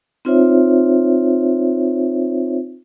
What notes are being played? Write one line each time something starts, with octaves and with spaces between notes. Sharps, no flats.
C4 D#4 F4 C5 C#5 E5